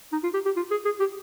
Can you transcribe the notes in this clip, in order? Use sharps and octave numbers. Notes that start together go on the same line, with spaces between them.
D#4
F4
G4
G4
F4
G#4
G#4
G4